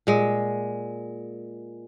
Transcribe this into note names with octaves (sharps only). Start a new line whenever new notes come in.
A#2 G#3